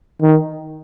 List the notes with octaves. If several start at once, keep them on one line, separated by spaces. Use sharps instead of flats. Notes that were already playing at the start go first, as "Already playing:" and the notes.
D#3